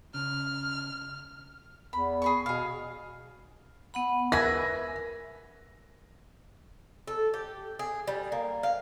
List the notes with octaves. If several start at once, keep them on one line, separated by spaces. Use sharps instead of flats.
C#3 F6
E2 B5
G#4 B5 C#6
B2 G#4 F5
B3 F#5 B5
A#4 B4 E5 G#5 A#6
A4
G4
G#4
G3
A#3
F5